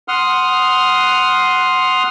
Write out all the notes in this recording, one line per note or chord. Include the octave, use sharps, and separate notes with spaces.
F#5 C6 D#6 F6